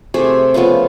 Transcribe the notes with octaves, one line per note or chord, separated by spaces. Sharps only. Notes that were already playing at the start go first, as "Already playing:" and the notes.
C3 A3 G#4 E5
C#3 F3 A3 B3